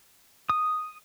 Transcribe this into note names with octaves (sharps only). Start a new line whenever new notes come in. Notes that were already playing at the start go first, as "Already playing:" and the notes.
D#6